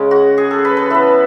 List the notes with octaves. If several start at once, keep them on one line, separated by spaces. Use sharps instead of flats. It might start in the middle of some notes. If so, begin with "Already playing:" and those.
Already playing: C#3 G#3 C#4
F#4
G#4
A4
B4
B4
E3 B3 A4